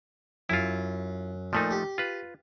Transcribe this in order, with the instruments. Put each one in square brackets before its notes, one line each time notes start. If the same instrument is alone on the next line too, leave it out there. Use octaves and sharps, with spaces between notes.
[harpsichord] F#2 [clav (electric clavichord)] E4 F4
[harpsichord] A#2 [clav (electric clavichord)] F3 A3 D#4
[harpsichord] G4
[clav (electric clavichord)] F4 B4